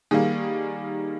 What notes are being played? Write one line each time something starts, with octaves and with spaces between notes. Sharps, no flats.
D#3 G3 A#3 G#4